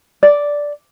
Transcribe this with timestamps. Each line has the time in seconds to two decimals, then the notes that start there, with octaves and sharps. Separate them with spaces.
0.23 D5